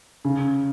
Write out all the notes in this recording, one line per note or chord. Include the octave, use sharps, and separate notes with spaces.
C#3